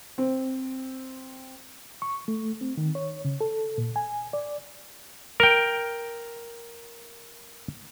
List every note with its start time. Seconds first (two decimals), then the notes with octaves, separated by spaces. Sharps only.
0.18 C4
2.02 C#6
2.28 A3
2.61 C4
2.77 D#3
2.95 C#5
3.25 C#3
3.41 A4
3.78 A#2
3.96 G#5
4.33 D5
5.40 A#4 G5